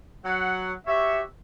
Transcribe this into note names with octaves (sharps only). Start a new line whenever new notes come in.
F#3 F#5
F#4 G4 C#5 E5